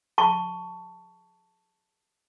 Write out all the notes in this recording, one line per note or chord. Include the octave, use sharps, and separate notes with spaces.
A5 C#6